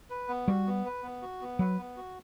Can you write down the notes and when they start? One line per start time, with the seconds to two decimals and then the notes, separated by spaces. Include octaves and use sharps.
0.10 B4
0.28 B3
0.48 G3 F#4
0.66 B3
0.85 B4
1.03 B3
1.22 F#4
1.41 B3
1.59 F#3 B4
1.78 B3
1.97 F#4